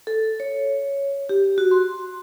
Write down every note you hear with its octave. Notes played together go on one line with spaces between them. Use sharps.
A4
C#5
G4
F#4
C6